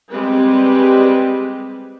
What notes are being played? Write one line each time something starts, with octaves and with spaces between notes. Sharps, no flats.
G3 G#3 C4 B4